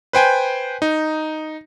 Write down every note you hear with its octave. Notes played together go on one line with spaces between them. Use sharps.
B4 C5 G5 G#5
D#4